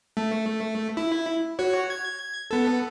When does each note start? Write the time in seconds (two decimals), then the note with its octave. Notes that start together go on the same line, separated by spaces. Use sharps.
0.17 A3
0.97 E4
1.59 F#4 C#5
1.90 G#6
2.51 B3 A4